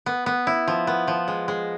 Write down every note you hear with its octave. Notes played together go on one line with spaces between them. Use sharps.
B3
B3
E4
F3
B3
F3
G#3
G#3